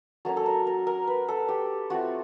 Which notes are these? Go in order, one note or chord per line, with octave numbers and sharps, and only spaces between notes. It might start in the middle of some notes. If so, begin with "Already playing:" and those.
F#3 A#3 C#4 A4
A4
A#4
A#4
A#4
B4
A4
G4
A3 C4 F4 F#4